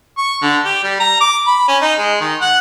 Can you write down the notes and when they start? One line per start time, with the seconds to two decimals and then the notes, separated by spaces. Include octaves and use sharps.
0.18 C#6
0.42 D3
0.65 G4
0.84 G3
1.00 A#5
1.21 D6
1.47 B5
1.68 C#4
1.82 D#4
1.99 G#3
2.20 D#3
2.41 F#5